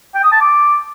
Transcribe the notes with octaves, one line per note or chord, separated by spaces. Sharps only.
G5
D#6
A5
D6